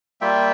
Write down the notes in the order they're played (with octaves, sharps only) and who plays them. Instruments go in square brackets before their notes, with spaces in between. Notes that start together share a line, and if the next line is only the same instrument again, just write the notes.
[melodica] G3 A#3 F4 E5 G5